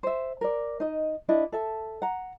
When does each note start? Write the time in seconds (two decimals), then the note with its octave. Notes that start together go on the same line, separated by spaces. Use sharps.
0.03 C5 E5
0.41 A#4 D5
0.80 D#4 D#5
1.29 D4 E4 D#5
1.52 A4 E5 A5
2.02 F#5 A#5